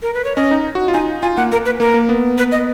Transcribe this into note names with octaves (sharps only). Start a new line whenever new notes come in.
A#4
B4
C#5
C#4 D#5
D#4
F#4
F4
D#4 G#5
F4 G#5
A#3 F#5
A#3 A#4
B4
A#3 A#4
A#3
B3
B4
D#5